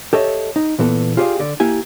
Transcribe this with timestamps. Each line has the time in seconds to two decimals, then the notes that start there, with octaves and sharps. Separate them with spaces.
0.13 G4 A4 C#5 D#5 E5
0.56 D#4
0.79 A#2 E3 B3 A4
1.17 F4 G4 G#4 D5 D#5 F5
1.39 D3 D5
1.60 A#3 E4 G4 G#5